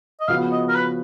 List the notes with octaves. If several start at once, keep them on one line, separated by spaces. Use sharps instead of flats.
D#5
C#3 F3 B3 F#4 F5
D#5
A#4
B4